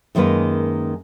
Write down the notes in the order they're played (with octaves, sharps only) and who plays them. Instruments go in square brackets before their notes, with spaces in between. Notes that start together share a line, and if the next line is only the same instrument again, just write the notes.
[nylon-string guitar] F#2 D#3 G#3 A#3 B4